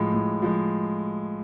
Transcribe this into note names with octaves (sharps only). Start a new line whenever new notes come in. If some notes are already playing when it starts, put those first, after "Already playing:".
Already playing: A2 F3 G#3
A2
F3 G#3